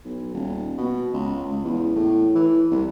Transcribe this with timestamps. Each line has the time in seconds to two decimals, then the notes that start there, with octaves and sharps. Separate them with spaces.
0.05 B1
0.34 D#1
0.78 B2
1.14 C#2
1.51 C#2
1.64 E2
1.95 A2
2.35 E3
2.71 C2